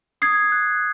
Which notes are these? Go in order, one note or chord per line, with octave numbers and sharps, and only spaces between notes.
D#6 G#6 C7
F#6